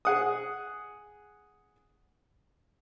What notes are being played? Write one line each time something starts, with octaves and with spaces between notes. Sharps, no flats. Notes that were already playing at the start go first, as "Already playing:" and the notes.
G#4 F#5 D#6